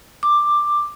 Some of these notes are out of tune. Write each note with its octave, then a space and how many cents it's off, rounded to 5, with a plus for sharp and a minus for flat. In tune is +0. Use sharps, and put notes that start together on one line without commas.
D6 +10